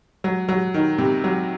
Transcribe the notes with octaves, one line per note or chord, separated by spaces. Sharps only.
F#3
F#3
D#3
C3
F#3